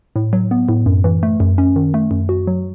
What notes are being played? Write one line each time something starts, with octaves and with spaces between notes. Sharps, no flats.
A2
F#3
B3
A2
F#2
E3
A3
F#2
C#4
D#3
A3
F#2
F#4
F#3